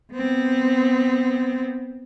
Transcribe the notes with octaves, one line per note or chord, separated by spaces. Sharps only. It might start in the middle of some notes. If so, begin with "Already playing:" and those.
B3 C4